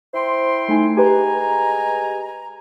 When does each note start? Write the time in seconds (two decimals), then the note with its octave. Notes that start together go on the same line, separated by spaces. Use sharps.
0.13 E4 C5 G5 C6
0.68 A3 D#4 G#5
0.97 G#3 G4 B4 G#5 A#5